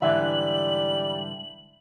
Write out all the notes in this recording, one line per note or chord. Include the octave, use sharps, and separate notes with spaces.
G#2 D3 E3 G3 E5 F#7